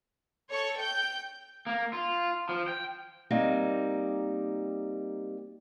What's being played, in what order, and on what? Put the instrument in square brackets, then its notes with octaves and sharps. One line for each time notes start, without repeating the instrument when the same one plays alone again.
[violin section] A4 C#5 C#6
G5 G6
[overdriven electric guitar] A#3
F4
F3
G5
[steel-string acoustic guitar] G3 A#3 C4 D#4